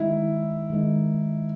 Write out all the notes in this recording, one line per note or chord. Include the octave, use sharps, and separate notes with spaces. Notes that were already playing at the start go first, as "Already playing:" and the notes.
Already playing: D#3 G#3 D#4 E4
D#3 G#3 D#4